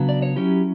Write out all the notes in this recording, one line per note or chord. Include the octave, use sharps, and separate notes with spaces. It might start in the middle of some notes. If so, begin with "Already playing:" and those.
Already playing: C#3 F#3 B3 D4
D5
C#5
F#3 C#4 E4 G4